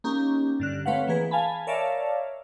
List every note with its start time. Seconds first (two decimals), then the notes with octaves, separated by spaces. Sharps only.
0.04 A#3 C#4 D#4 G4
0.60 G2 D3 F#6
0.86 A3 C4 B4 C#5 F5 F#5
1.07 E3 A#3 G#4 B4
1.31 F5 G#5 A5 B5
1.67 A#4 C#5 D5 E5 F5 A5